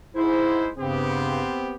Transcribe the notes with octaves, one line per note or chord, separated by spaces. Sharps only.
G#2 E4 C5
G2 C#3 B3 C4 G4